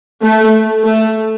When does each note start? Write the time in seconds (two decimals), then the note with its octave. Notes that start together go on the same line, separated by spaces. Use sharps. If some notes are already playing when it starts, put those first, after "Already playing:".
0.22 A3
0.84 A3